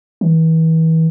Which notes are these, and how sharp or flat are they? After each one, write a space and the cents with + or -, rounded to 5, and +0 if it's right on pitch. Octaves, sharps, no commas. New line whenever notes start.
E3 -35